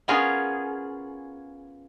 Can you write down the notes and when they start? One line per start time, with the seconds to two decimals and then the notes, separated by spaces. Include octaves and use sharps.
0.08 B3 C#4 F4 G#4 A#4